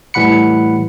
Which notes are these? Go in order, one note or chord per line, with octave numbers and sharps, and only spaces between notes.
A2 E3 G3 F#5 B5 C#7